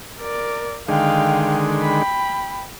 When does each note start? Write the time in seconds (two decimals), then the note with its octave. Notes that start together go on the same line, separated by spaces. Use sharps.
0.20 A#4 D5
0.88 D3 D#3 G#3 F5 G5
1.82 G5 B5